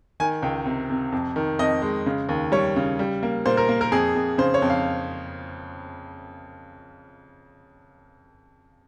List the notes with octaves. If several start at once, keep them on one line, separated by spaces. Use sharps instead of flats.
D#3 G#5
C#2 G5
C3
C3
F2
D#3
F2 D#5
G#3
C#3
D#2
G3 C#5
C#3
G3
A#3
A#2 C5
A#4
A#3
A#4
F2 G#4
F2
C#3 C5
C#5
F2
F5